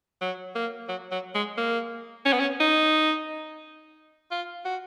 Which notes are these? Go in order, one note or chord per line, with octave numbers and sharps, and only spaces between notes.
F#3
A#3
F#3
F#3
G#3
A#3
C#4
B3
C#4
D#4
F4
F#4